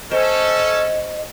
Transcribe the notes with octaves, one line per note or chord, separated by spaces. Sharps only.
C#4 A4 C5 D#5